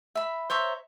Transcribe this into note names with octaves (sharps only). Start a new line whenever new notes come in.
E5 B5
C5 C#5 E5 A#5